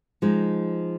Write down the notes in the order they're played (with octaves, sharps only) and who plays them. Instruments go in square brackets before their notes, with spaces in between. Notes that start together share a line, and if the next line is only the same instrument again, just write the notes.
[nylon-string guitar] F3 G#3 D#4